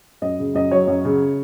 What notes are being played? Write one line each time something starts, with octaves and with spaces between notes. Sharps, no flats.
F#2 D#5
C#3
F#2 D#5
F#3 C#5
F#2
C#3